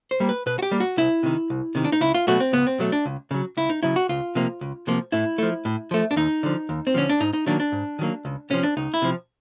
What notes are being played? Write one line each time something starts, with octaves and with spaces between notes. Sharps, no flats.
C5
G3 A#3
B4
B2 B4
F#4
G4
G3 A#3
F#4
C2 E4
C3 D#3
C2
C3 D#3
D4
D#4
C#2 E4
F4
B2 F#3 A3 F#4
C4
C#2 B3
C4
B2 F#3 A3
D4
C#2
C#3 F#3
C#2 E4
D#4
C#3 F#3 E4
F#4
C#2 F4
C3 F3 A#3
C#2
C3 F3 A#3
A2 E4
F3 A3
A2
F3 A3
D4
D#2 D#4
D3 F3
D#2
C4
D3 F3 C#4
D4
G#2 D#4
D#4
D#3 F#3 A#3 D4
D4
G#2
D#3 F#3 A#3
C#2
C3 F3 C#4
D4
C#2 D#4
E4
C3 F3